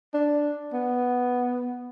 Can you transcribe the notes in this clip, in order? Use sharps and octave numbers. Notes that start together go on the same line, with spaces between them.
D4
B3